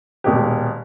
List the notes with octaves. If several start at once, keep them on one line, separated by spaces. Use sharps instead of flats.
D#1 B2 G#3 A#3 G4